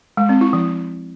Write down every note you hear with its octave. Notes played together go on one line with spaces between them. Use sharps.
G#3
C4
E4
F3